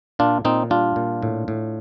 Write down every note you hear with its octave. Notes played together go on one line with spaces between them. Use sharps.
A#2 D4 F4
A#2 C4 D#4
G3 D4 F4
A#2
A2
A2